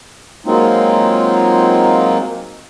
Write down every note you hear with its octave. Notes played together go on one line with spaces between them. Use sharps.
F#3 G#3 A#3 C4 D#4 F4